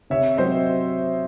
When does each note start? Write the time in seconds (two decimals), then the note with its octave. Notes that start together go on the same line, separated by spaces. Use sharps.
0.10 C3 C#5 E5
0.37 F#3 C4 C5 D#5